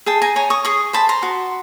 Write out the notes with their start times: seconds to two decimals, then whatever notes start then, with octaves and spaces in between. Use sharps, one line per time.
0.06 G#4 G5 A5
0.22 G#5 A#5
0.36 C#5 G#5 A#5
0.50 C#6 D#6
0.65 G#4 C#6 D#6
0.93 C5 A5 B5
1.09 A#5 C6
1.23 F#4